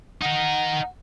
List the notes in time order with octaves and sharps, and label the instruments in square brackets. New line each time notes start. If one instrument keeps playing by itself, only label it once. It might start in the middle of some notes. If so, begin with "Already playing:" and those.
[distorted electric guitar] D#4 A#4 [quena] F#5